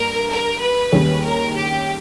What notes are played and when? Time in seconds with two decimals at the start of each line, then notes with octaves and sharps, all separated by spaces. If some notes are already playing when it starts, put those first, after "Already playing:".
Already playing: G2 A#3 A#4
0.29 A#4
0.61 B4
0.92 D#2 D#3 G3 C#4 G#4
1.23 A#4
1.55 G4